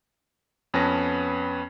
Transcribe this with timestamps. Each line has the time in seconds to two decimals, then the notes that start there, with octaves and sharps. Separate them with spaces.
0.74 F2 B3 C#4 B4 A5 A#6